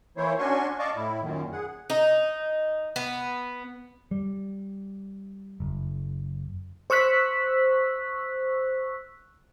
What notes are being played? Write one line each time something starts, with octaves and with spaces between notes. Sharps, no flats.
E3 A#3 E4 C5 C#5
C#4 D4 F#4 G#5 C6 C#6
D5 D#5 F5 A5 C#6 D6
A2 E4
F#2 A#2 D#3
G#4 F#5
D#4
B3
G3
F#1
C5 C#6 E6 F#6 B6